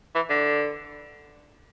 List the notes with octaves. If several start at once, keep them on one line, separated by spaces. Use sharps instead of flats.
E3
D3